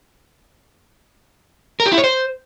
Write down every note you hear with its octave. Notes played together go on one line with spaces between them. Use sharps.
A#4
G4
E4
C#5
C5